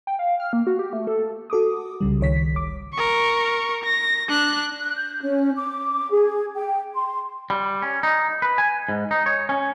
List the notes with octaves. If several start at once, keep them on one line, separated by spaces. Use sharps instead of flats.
G5
F5
F6
A#3
F#4
G4
A3
A4
F#4 A4 D6 D#6
C2 C#3 G3
C#2 D#3 C#5 B6
G1 D6
A#4 C#6
A#6
D4 F#6
F#6
G6
C#4
D6
G#4
G5
C6
G3
C#4
D#4
B4
G#5
G#2
D#4
C#5
C#4